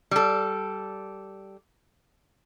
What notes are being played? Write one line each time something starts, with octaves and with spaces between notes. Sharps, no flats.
G3 A4